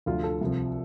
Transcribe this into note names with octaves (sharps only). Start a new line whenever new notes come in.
D2 D3 F3 F4
A4
C2 C3 F3